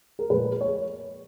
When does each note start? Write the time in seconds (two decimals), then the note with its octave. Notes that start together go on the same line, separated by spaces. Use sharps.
0.19 A#4
0.30 A#2 F3 G#3 B4
0.61 C#5